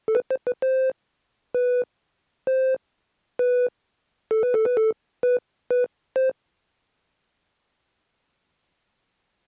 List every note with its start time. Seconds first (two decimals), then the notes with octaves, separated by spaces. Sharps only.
0.08 A4
0.15 B4
0.31 C5
0.47 B4
0.62 C5
1.55 B4
2.47 C5
3.39 B4
4.31 A4
4.43 B4
4.54 A4
4.65 B4
4.77 A4
5.23 B4
5.71 B4
6.16 C5